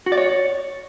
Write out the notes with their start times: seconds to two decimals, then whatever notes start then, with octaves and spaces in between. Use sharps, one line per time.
0.06 F#4
0.12 D5
0.18 C#5